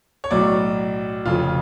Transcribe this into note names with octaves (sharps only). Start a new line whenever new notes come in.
C#5
B1 A2 F#3 D5
F1 F2 C#3 F4